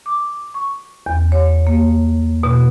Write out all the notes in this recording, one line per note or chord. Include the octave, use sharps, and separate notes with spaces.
D6
C#6
E2
C#5
A#3
B2